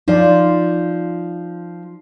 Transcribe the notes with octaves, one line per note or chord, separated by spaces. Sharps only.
F3 D#4 F4 D5